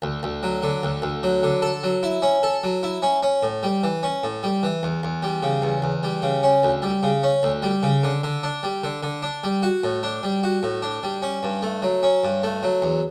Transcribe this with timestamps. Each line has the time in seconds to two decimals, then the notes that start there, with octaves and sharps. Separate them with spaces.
0.02 D2
0.23 D2
0.43 F#3
0.63 D3
0.83 D2
1.02 D2
1.23 F#3
1.43 D3
1.62 A4
1.83 F#3
2.03 E4
2.22 C#4
2.43 A4
2.63 F#3
2.83 E4
3.02 C#4
3.23 C#4
3.43 A2
3.63 G3
3.83 E3
4.03 C#4
4.23 A2
4.43 G3
4.63 E3
4.83 E2
5.03 E2
5.23 G3
5.43 C#3
5.62 E2
5.82 E2
6.03 G3
6.22 C#3
6.43 C#4
6.63 D2
6.82 G3
7.03 C#3
7.23 C#4
7.43 D2
7.62 G3
7.83 C#3
8.03 D3
8.23 D3
8.43 D4
8.63 G3
8.83 D3
9.03 D3
9.23 D4
9.43 G3
9.63 F#4
9.83 A2
10.03 D4
10.23 G3
10.43 F#4
10.63 A2
10.82 D4
11.03 G3
11.22 C#4
11.43 G2
11.62 A3
11.82 F#3
12.03 C#4
12.24 G2
12.43 A3
12.63 F#3
12.82 E2